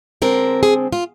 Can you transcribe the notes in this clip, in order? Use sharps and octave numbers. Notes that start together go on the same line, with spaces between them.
D3 G#3 C4 A#4
G#4
F4